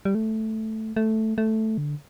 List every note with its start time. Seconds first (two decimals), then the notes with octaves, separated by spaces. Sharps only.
0.05 G3
0.15 A3
0.96 A3
1.38 A3
1.78 D3